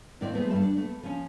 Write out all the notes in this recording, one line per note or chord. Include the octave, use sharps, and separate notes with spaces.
D#2 A2 D#3 C4 D5
E3 G#3 A3 B3 C4 C5
G2 G3 A3 A4 E5 A5
D4
A3 B3
F3 C#4